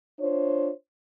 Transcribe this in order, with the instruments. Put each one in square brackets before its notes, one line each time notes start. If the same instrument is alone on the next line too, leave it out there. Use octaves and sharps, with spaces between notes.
[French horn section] D4 F4 C5 C#5